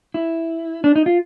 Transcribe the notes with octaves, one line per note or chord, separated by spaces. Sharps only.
E4
D4
D#4
F4